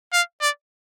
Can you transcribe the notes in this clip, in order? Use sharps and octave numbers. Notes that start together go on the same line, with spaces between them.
F5
D5